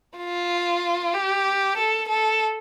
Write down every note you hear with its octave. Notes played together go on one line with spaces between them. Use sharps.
F4
G4
A4
A4